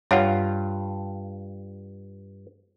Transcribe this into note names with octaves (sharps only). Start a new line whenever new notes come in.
G2 F4 C#5 F5 F#5